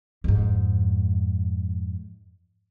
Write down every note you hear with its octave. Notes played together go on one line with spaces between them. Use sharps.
F2 G#2